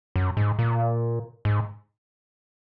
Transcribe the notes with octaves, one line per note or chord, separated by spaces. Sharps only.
F#2
G#2
A#2
G#2